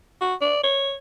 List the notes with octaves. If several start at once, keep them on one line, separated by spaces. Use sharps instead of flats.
F#4
D5
C#5